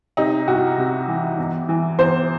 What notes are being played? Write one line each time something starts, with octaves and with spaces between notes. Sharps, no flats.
C3 D#4
C2 F#4
C3
E3
E2
E3
E2 C5